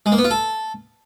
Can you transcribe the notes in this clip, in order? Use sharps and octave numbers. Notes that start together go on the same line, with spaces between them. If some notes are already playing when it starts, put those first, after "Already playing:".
G#3
A#3
B3
F4
A4